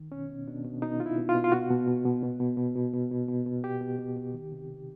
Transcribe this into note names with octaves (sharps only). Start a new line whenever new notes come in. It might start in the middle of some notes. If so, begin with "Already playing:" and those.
Already playing: D#3
B2 C#4
B2
B2 D4
B2
B2 D#4
B2 F4
E4
B2
F4
B2
F4
B2 F#4
B2
B2
B2
B2
B2
B2
B2
B2
B2
B2
B2
B2 G4
B2
B2
B2
D#3
C3
C3